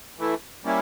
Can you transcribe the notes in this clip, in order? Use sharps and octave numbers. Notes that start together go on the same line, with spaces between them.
E3 A3 E4
G3 A#3 C#4 E4